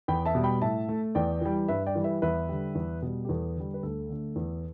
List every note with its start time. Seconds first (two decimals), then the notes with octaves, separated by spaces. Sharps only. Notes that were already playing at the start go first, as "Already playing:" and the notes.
0.08 E2 G5 B5
0.26 E5 A5
0.35 B2 G3
0.44 G5 B5
0.62 A2 E5 A5
0.89 A3
1.15 E2 D5 G5
1.41 E3 G3
1.68 G2 B4 E5
1.86 D5 G5
1.95 E3 G3
2.04 B4 E5
2.22 E2 B4 E5
2.49 D3 G3
2.75 E2
3.02 B2 G3
3.25 G4
3.29 E2 A4
3.56 D3 G3
3.74 B4
3.83 D2 A4
4.09 D3 A3
4.36 E2